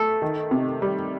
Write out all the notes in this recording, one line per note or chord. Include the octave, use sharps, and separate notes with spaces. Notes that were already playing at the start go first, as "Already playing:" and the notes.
Already playing: A3 A4
D#3
C3
G3